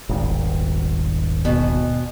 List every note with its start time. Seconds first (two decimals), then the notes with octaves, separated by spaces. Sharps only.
0.09 D#1 G#1
1.45 D2 B2